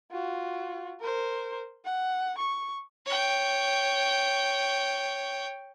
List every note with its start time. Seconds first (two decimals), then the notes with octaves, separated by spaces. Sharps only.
0.11 F4 F#4
1.01 A#4 C5
1.84 F#5
2.38 C#6
3.06 C#5 G5